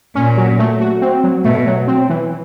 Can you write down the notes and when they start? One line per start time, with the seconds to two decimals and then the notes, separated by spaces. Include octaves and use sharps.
0.15 A#2 C#4
0.37 F#3
0.59 A3
0.81 F#4
1.02 C4
1.24 F#3
1.45 B2 A3
1.67 F#3
1.88 C4
2.10 E3